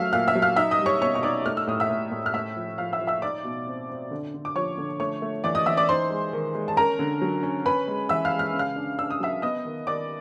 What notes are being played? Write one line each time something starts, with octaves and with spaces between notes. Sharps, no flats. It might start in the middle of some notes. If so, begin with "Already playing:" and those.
Already playing: F#3 A3 E5 F5 E6 F6
A#2 F5 F6
E5 E6
F#3
F5 F6
D#4 E5 E6
D#5 D#6
G3
C#5 C#6
B2 C#5 C#6
C#6
D#4 D5 D6
A3 F6
E6
A2 D#6
E5 E6
A2
A2
F6
A3 E5 E6
F3
F3 F5 F6
E5 E6
F3
E5 E6
D#4 D5 D6
B2
C4
C4
D3
D3
D6
F3 C#5 C#6
D3
A3 C#5 C#6
A3
E3 D5 D6
D#5 D#6
E3 E5 E6
D5 D6
D#4 C5 C6
G#3
D#3
G#3
A5
C#4 A#4 A#5
D3
F#3
C#4
C#4 B4 B5
G#3
E3 E5 E6
F5 F6
G#3
F6
C#3
F5 F6
D4
D4 E6
D#6
F#3 E5 E6
B3 D#5 D#6
D#3
D#3 D5 D6